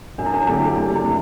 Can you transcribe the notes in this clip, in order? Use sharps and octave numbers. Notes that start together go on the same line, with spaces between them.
F#2 D4
E4
D4
D3 A3 D4 E4 G4
F#1 D4
E4
A3